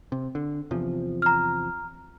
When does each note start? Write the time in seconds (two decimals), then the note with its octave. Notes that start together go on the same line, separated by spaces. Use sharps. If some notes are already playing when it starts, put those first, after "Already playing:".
0.12 C3
0.35 D3
0.71 E2 C3 F3
1.22 A#5 F6